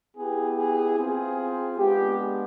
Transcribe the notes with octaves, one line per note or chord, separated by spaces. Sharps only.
B3 E4 G4 G#4
G#4
C4 F4 G#4
G#3 B3 D4 G4